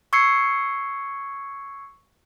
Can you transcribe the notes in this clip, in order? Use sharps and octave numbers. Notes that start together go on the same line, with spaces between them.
C#6 E6 G#6 C7 C#7